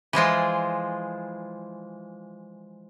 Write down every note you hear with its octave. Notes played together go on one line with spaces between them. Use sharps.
E3 F3 G#3 F4